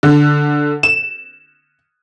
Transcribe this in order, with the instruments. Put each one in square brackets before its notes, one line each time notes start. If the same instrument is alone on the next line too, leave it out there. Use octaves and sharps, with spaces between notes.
[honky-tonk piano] D3
E7